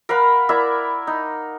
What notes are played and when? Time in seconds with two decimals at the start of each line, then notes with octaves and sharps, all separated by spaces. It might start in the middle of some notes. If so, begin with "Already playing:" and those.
0.09 A#4 F5 F#5 B5
0.49 E4 A#4 D5 E5
1.07 D#4